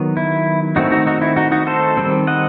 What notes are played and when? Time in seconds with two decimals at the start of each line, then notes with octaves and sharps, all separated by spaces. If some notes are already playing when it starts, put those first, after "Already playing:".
Already playing: D#3 F#3 B3
0.17 E4
0.76 D#3 A3 C4 D#4 F#4
0.92 D#4 F#4
1.07 D#4 F#4
1.21 E4
1.36 D#4 F#4
1.52 D#4 F#4
1.67 A4 C5
1.97 D#3 G3 C4
2.27 D#5 F#5